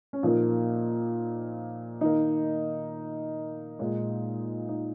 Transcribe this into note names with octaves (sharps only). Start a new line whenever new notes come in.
C#4
A#2 F3 A#3 D#4
D#3 A#3 D#4
A#2 G#3
D#4